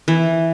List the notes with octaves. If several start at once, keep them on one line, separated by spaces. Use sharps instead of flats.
E3